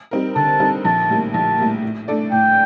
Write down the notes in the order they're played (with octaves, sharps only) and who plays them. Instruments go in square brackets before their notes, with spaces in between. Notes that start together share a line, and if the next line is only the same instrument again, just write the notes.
[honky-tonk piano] G3 C4 D#4 A#4
[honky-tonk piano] D3 [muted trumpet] A5
[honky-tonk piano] G3 C4 D#4 A#4
[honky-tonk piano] A#1 [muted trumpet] A5
[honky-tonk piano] A2 G3 A#3
[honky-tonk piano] A#1 [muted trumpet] A5
[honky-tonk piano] A2 G3 A#3
A2
A3 D4 A4 D5
[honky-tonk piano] A2 [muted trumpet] G5